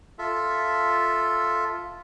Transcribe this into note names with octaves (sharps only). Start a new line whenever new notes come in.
F4 A4 E5